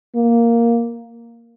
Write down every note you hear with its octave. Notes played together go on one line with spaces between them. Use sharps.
A#3